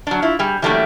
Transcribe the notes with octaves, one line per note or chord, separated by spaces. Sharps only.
F#3 D4
E4 F4
G3 G#4
E3 F#3 G3 A3 A#3 D4